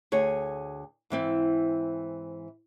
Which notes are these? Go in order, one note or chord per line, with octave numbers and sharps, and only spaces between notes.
D2 G#4 C#5
G#2 E3 C4